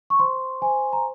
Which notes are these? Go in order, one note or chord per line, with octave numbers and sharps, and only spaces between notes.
C#6
C5 C6
C5 G#5
A#5